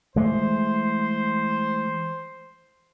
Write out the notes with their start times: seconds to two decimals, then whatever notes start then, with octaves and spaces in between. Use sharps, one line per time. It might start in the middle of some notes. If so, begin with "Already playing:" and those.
0.16 E3 G#3 A3 C5